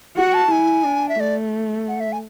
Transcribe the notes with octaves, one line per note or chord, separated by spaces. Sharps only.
F#4 F#5
A5
E4 G#5
D4
E5
A3 D5
F#5
E5
G#5